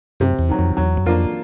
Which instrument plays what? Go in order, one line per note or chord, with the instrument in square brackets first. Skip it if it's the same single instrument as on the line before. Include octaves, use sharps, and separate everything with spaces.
[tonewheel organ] F#2 [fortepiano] C3
[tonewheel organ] E2
[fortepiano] D#3 F#3
[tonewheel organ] F2
[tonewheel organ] E2 [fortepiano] F#3
[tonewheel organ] F#2
[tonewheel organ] F2 [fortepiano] A#3 D4 F4 A#4